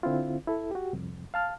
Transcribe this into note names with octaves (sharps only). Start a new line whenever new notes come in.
D3 C4 E4 F4
E4 A4
F#4 G4
C2 F2
F5 A5 F6